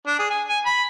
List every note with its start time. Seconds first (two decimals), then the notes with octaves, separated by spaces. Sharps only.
0.07 D4
0.19 G#4
0.30 G#5
0.48 G#5
0.65 B5